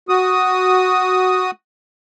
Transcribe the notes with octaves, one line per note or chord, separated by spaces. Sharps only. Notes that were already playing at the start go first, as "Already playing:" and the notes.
F#4 D#6